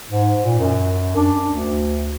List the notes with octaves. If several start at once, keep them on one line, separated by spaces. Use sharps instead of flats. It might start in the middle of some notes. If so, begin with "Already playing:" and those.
G#2
A#2
F#2
D4
D2